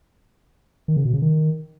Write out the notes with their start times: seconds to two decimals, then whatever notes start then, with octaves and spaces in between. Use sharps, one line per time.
0.88 D#3
0.97 C#3
1.05 B2
1.13 C#3
1.22 D#3